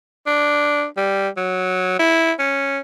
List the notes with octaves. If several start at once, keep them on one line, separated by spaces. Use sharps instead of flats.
D4
G3
F#3
E4
C#4